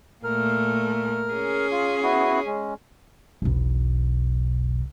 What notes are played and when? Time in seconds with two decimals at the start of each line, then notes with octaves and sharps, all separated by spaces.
0.24 A#2 A3 A#4 F6
1.33 C#4 G#4
1.71 F4
2.03 B3 E4 F#4
2.46 G#3 C#4
3.42 E1 B1